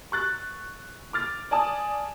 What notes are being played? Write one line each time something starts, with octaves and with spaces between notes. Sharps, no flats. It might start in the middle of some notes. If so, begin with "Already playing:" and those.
C#6 F#6 A6
D6 F6 A6
D5 G#5 A5 D#6